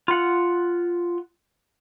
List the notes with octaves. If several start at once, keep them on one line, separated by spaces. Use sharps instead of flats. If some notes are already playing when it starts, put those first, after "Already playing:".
F4 F#5